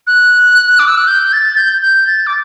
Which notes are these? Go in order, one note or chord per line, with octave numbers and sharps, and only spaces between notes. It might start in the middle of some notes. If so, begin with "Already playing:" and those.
F#6
D6
E6
F#6
G6
A6
G6
G6
A6
D6